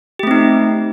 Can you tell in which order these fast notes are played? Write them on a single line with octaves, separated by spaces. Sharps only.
G4 A3 C4 D#4